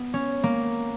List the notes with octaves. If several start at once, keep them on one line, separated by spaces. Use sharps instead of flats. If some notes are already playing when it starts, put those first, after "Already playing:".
Already playing: B3
C#4
A#3